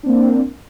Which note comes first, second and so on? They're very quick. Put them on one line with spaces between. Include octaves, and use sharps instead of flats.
D4 C4 A#3